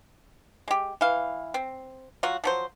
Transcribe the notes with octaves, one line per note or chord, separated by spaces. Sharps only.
G#3 G4
E3 F5
C4
F#3 F4 F#4
F3 F#3 C5